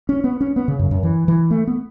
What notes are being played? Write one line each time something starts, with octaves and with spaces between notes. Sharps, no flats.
C#4
B3
C#4
B3
C#3
F#2
F#2
E3
E3
A3
B3